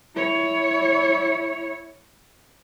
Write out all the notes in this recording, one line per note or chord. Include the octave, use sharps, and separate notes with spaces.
E4 C#5